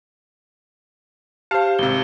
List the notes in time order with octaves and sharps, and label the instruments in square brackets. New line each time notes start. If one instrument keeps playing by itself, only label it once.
[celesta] G4 [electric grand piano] C5 A5 [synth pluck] F5
[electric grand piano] G#1 C3 [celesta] G7